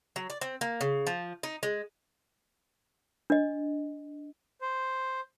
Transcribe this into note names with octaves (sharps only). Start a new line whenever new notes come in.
F#3
D5
C4
A#3
C#3
F3
D#4
G#3
D4 D#5
C5